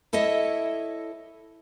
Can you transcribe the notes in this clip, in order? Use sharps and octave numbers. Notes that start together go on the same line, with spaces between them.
E4 A4 C#5 D#5 E5